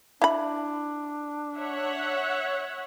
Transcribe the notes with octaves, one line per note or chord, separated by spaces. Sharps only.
D4 E4 B5
C#5 E5 F#5